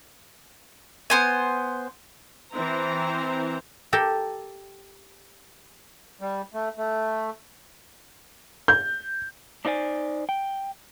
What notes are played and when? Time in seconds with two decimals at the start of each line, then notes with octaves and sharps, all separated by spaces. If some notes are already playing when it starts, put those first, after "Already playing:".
1.10 B3 C5 G#5
2.52 E3 C4 C5 A#5
3.93 G4 A4 A#4
6.21 G3
6.54 A3
6.78 A3
8.68 G6
9.65 D4 D#4 C5 D5 G#5
10.29 G5